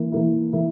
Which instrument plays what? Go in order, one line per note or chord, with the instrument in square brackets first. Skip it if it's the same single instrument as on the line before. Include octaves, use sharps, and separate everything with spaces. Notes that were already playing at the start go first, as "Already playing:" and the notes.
Already playing: [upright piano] E3 A#3 E4
E3 A#3 E4
E3 A#3 E4